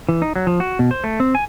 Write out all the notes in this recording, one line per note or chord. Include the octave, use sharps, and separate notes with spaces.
E3
D#4
F#3
F3
F#4
B2
C5
A3
C4
G#5